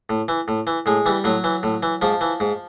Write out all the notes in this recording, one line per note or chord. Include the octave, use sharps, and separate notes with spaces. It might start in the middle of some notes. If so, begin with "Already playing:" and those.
A2
E3
A2
E3
A2 G#3
E3 G3
A2 F#3
E3
A2
E3
G#2 F3
E3
G#2